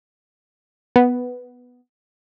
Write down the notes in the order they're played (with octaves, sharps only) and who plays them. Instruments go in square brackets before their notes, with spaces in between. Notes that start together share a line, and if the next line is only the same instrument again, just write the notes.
[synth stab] B3